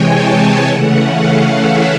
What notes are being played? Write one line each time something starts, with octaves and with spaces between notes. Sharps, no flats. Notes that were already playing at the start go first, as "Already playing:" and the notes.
Already playing: C3 E3 G#3 C#5 G5 G#5
A5
G5
C#3 E3 A3 C#4 F#5
F5
E5